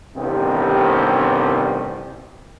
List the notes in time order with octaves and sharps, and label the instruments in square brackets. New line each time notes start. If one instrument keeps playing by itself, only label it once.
[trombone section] A1 G2 C3 D#3 B3 C4